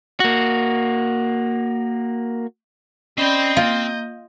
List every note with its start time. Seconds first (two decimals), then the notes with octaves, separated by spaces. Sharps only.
0.20 A#3 F#4
3.18 C4 C#4 D5 D#5 G5 B5 G6
3.57 A#3 F4